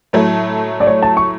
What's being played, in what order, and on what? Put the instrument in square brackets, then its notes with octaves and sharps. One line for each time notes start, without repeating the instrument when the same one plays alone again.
[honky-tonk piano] A2 F#3 A3
[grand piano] D5
C#5
A5
C#6